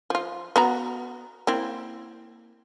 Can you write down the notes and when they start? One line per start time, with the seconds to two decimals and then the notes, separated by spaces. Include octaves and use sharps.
0.10 F3 F4
0.56 B3 F#4 A#5
1.47 A#3 C4 E4